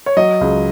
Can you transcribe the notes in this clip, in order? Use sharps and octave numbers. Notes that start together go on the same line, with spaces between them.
C#5
F#3 D#5
C#2